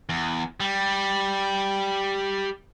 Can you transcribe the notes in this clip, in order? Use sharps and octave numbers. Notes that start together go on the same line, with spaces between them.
E2
G3